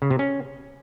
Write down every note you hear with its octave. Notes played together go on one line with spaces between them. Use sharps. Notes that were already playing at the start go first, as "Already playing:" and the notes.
C#3
C3
C#4